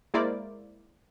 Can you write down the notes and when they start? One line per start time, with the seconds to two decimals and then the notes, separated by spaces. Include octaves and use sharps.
0.14 G#3 A#3 E4 C5 D5